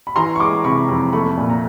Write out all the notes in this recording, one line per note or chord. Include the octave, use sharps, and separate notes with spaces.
B5
E3 A#5 C6
C#6
G#3 C6 D6
C3 B5 C#6
F2
A3 B5 C#6
A#2
A#5